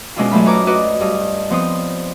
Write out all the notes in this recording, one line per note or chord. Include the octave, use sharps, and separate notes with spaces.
B2 G#3 C#4 D4 E4 F4
F#2 F#3 A3 F4 B5
D#4 B4 C#5 A#5 D6
F#4 B4 D5 D#5
G2 D#6
F3 B3 C4 C6 D#6